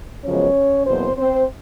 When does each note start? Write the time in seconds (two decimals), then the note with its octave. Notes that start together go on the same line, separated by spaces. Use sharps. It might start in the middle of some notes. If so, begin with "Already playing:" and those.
0.25 F#2 C#3 F3 G#3 B3 C#4 C#5
0.86 E2 B2 F#3 A#3 C4 C5
1.16 C4 C5